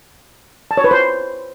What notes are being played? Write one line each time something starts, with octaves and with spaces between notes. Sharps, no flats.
A5
C#5
B4
C5